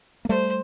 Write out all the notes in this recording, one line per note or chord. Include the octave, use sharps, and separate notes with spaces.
A#3
G3 A3 C5